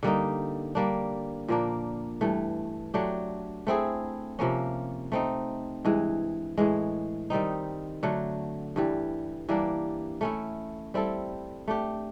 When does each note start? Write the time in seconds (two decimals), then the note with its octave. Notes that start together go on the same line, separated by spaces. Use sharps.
0.03 D3 G3 A#3 D#4
0.75 G3 A#3 D4
1.48 A#2 F3 A#3 D4
2.21 G2 E3 A3
2.94 F#3 A3 D4 G4
3.67 A3 C4 E4 G#4
4.39 C3 F3 A#3 C#4
5.12 A3 C4 D#4
5.85 G2 E3 G#3
6.57 A2 E3 G#3
7.30 D#3 G3 C4 D#4
8.03 D3 F#3 A3
8.76 G2 E3 G3
9.49 E3 G3 A#3 D4
10.21 A3 C#4 E4
10.94 G3 C4 E4 A4
11.68 A3 D4 G4